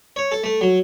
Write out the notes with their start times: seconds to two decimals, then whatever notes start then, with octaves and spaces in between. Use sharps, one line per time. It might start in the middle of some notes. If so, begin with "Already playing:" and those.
0.16 C#5
0.32 A4
0.44 A3
0.61 F#3